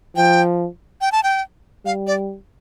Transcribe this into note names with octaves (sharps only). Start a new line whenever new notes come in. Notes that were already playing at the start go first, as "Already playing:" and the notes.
F3 G5
G5
A5
G5
G3 F5
D5